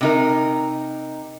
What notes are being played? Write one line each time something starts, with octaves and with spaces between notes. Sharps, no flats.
C3 D#4 A#4